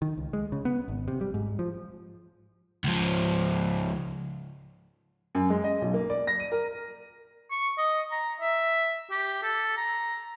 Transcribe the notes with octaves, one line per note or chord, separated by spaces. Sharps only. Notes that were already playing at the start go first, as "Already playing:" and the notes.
D#3
C#2
G#3
C#3
B3
G#1
C3
G3
G#2
F3
C#2 F3
F#2
G#3
D#5
B1
A#3
D5
A#6
D#7
A#4
C#6
D#5
A#5
E5
G4
A4
A#5